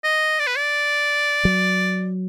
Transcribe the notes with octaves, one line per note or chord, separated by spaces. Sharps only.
D#5
D5
B4
D5
F#3